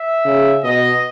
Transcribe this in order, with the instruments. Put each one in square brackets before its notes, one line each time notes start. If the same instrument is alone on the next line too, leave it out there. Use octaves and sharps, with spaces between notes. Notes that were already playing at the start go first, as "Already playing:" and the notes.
Already playing: [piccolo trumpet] E5
[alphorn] C#3
[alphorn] B2 [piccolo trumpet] D#5